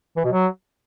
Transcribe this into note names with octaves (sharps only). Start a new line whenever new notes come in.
E3
B2
F#3